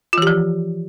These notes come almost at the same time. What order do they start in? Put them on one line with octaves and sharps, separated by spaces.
F4 E3 G4 F3